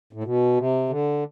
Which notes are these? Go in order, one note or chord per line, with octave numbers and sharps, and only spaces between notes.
A2
B2
C3
D3